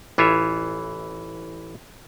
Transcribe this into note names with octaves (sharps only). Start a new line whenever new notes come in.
A1 E3 F4 C#5 E5